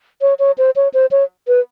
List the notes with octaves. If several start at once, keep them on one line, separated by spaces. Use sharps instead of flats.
C#5
C#5
C5
C#5
C5
C#5
B4